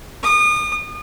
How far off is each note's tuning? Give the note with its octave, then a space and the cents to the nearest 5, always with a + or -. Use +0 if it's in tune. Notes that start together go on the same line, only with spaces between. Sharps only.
D#6 -35